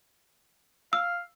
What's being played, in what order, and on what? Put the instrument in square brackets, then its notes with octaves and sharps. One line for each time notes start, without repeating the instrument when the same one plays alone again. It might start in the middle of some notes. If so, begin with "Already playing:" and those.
[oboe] F5 [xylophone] E6